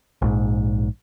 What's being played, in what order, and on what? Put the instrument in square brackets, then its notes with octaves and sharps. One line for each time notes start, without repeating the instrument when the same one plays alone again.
[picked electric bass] A#1 G#2